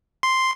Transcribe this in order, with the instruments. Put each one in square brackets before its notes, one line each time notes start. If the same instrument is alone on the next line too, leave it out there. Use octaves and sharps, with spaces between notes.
[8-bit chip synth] C6